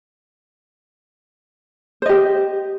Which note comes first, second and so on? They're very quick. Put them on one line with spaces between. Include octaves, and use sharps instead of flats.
C5 D#5 G4